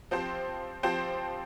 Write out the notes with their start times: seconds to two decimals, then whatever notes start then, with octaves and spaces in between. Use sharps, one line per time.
0.11 F3 C4 G4 C5
0.83 F3 C4 G4 C5